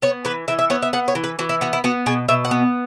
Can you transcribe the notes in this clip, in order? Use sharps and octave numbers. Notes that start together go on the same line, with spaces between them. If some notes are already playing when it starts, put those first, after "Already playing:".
B3 C#5
E3 B4
E3 E5
E5
B3 C#5
E5
B3 F#5
C#5
E3
B4
E3 F#4
E4
B3 F#4
E4
B3 F#4
B2 G#4
B2 E5
F#5
B3